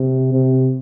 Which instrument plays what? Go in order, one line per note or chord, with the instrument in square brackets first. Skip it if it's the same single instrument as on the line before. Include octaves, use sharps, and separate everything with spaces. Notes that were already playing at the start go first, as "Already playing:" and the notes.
Already playing: [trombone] C3
C3